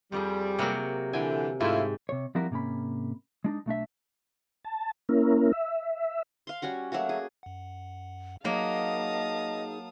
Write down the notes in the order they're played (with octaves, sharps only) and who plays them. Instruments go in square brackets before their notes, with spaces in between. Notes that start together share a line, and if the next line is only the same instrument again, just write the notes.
[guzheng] F2 F3 G#4 [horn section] G3
[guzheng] C3 F#3 A#3
[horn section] D3 E3 [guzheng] G5 G#5
[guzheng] G#2 [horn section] A3 E4 F4
[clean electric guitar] C3 C#5
F3 G3 C4 E4 F#4 A#4
G#2 C3 A#3 C#4 B5
G#3 D4 D#4
B1 A3 D4 E5
[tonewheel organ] A5
A#3 C#4 E4 A#4
E5
[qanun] F5 C6
G3 C#4 F#4 F#5
F#3 A3 A#3 F#4
G#4
[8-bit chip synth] F#2 F#5
[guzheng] F#3 A#3 [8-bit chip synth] D#4 G#4 [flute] D#5 [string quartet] F5 A5 D#6